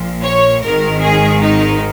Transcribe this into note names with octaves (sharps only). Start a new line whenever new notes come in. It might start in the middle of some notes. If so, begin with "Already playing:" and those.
Already playing: A#1 A#2 F3
C#5
G#1 G#2 D#3 A#4
G#4
D#4